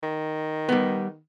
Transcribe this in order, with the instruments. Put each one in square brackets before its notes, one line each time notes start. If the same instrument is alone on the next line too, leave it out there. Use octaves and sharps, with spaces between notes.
[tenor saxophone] D#3
[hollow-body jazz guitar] G3 B3